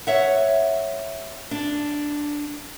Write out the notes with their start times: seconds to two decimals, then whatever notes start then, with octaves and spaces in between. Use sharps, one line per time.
0.07 C#5 E5 F#5
1.51 D4